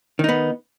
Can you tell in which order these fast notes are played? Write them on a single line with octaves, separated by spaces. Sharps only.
D#3 D#4 B3